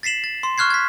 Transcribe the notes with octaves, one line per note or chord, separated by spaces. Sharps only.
A6 B6 C7 E7 F#7
A6
C6
C#6 F6 F#6 G#6 C7
G#6 B6